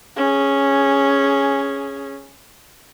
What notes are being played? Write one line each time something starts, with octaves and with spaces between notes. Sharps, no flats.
C#4 G#4